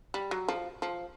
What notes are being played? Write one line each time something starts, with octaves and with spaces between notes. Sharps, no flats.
G3
F#3
F3
F3